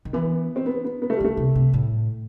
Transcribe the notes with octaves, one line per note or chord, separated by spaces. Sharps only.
D#3
E3 B3
C4
B3
B3
B3
A3
G3
D#3
A3
C3
C3
A2